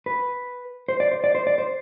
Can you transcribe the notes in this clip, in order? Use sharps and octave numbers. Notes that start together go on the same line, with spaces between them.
B4
C5
D5
C5
D5
C5
D5
C5